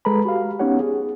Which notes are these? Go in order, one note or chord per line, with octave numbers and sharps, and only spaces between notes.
G#3 A4 B4 A#5 B5
F#4 G4 F5
B3 C#4 D#4 G4 C#5 F#5
G#4